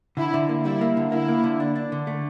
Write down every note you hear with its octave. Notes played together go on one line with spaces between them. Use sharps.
D3 E4
D3
A#3
G3 E4
A#3
D3
A#3 E4
A#3
D3
D4
D4
D3
A3